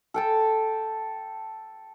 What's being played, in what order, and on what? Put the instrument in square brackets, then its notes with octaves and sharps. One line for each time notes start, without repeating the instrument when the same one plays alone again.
[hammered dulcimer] A4 G5 A5